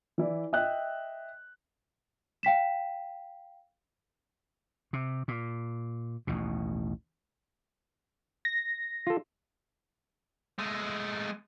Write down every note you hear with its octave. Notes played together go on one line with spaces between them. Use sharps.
E3 E4 D5
D#5 E5 G5 F#6
F5 G5 B6 E7
C3
A#2
A1 D#2 B2
A#6
F4 A4
G#3 A3